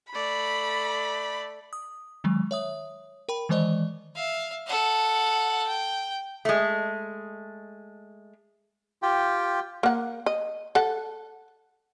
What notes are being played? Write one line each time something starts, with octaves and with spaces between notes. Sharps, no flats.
A3 D5 B5
D#6
D#3 F#3 G#3
C#5 E5 D#6
A#4 G5 B5
D#3 E3 G#3 C5 D5 D#5
E5 F5
A4 F#5
G5
G#3 A3
F4 G4 G5
A#3 F#5
D#5
A4 F#5